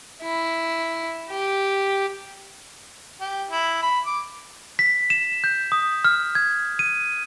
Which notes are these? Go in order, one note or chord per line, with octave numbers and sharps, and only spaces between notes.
E4
G4
G4
E4
B5
D6
B6
E7
G6
D#6
F6
G#6
D#7